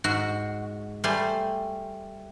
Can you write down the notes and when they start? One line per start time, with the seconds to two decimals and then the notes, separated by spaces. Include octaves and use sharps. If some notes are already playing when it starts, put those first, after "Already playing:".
0.04 G#2 F#4
1.04 G3 A3 C5 G#5